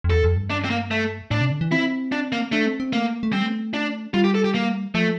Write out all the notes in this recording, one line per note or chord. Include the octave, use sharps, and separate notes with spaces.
F2
E2 A4
F2
G2
D4
C4
A#3
A3
A2 D4
C3
D3
E3
C4 E4
D4
A#3
A3 D4
C4
C4
A3 A#3
A#3
A3
G3 C4
A3
D4
G3 F4
G4
A4
G4
A#3
F3 A3